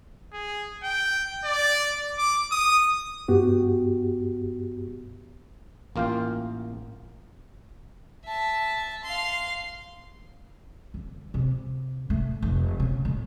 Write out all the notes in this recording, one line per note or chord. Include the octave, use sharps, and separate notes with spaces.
G#4
G5
D5
D6
D#6
G2 B3 F#4 G4
A1 A#3 F4 F5 G5
E5 A5
F5 C6
D3
C3
A3
F1
C#3
A2